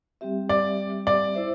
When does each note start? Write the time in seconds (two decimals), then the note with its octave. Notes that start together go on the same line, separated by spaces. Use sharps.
0.21 G3 C4 G4 E5
0.49 D5
1.07 D5
1.35 E4 C5 E5